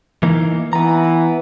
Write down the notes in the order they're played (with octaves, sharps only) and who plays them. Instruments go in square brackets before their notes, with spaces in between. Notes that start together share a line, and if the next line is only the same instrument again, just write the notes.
[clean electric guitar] E3 A#3 D#4
[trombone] E3 [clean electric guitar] B3 A#5